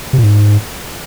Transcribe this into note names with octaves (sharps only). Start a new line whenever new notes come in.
C3
A#2
G#2